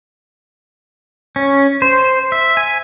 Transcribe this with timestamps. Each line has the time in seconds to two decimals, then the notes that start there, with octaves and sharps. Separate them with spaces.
1.36 C#4
1.82 C5
2.32 E5
2.57 G#5